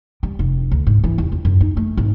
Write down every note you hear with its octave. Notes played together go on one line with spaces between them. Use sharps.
G3
F1
D2
G#2
E3
D#2
F2
F#2
D#4
A3
G#1